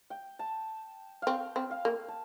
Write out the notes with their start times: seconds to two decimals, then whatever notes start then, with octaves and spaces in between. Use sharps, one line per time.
0.10 G5
0.39 A5
1.22 C4 F5 G5
1.56 C4
1.71 F5
1.85 A#3
2.08 A5